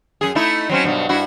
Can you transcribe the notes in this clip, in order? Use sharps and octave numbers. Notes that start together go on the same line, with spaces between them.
F#2 G#4
A3 D#4 E4
F#3 C4 C#4
G2 B2 F#3
G2 E4 F#4